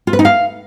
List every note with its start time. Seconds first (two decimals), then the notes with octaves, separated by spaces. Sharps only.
0.07 F4
0.13 B4
0.19 D#4
0.25 F5